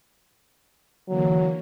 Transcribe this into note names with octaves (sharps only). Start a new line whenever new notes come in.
D3 E3 F#3 A#3